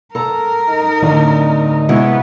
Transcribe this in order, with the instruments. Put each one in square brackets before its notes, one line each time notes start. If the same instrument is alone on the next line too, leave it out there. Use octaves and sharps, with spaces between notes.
[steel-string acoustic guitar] A4 A#5 [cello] A#4
[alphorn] D#4
[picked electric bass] A2 D3 D4
[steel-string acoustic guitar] C3 G#3 E4 [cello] B3 [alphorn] F#4